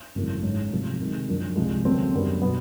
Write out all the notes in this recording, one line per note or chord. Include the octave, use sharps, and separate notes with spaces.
G#1 F#2 C#3 E3 A3
G#2 E3 G#3 C#4 E4
C3 F3 A3
C3 D#3 G#3
F#2 D3 F3 A#3
C2 C3 F3 G#3
D#2 C#3 F#3 A3 C4
F#2 D3 G3 B3
B2 G3 B3